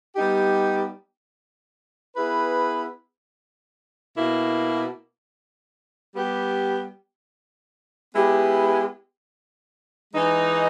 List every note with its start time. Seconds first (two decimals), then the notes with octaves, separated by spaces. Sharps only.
0.15 G3 B3 D#4 G4
2.14 B3 E4 G#4 B4
4.15 B2 A#3 E4
6.14 G3 B3 G4
8.14 G#3 B3 E4 G4
10.14 E3 G#3 D#4